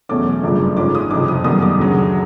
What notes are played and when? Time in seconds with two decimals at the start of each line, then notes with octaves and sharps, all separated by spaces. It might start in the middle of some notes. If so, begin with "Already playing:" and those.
0.09 E2 B2 F#3 A3 C#4 D6
0.43 G1 F#2 C#3 F3 A3
0.77 G#2 F3 G#3 C#4 D6
0.95 D#6
1.10 F#1 F2 C3 D6
1.28 D#6
1.44 F#2 D#3 G3 B3 D#6
1.62 D6
1.78 D2 C#3 F#3